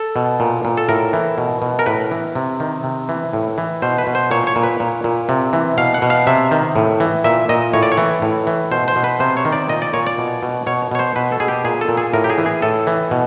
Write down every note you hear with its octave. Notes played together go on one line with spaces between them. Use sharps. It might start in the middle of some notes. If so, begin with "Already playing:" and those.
Already playing: A4
B2
A#2
A#2
A4
A2 A#4
E3
B2
B2
A#4
A2 B4
E3
C3
D#3
C3
E3
A2
E3
B2 C5
B4
B2
C5
A#2 C#5
C#5
A#2
B4
A#2
A#2
C3
E3
B2 F5
F#5
B2
F5
C3 E5
D#3
A2
E3
A#2 E5
A#2 D#5
A2 C#5
D5
C#5
E3
A2
E3
B2 C5
C5
B2
B4
C3 C5
C#5
D#3
D5
A#2 D#5
D5
A#2 C#5
D5
B2
B2
B2 C#5
B2 C#5
C5
B2 B4
A4
B2 G#4
G4
A#2 G#4
A4
A#2
G#4
A2 A#4
G4
G#4
E3
G#4
A2 A4
E3
B2